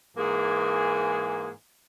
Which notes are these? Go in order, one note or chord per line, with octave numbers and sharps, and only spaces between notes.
G#2 E3 A#3 G#4